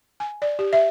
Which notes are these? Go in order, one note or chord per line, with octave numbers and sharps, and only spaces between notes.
G#5
D5
G4
E5